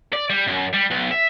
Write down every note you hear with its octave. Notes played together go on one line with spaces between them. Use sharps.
D5
G3
F#2
G3
B1
E5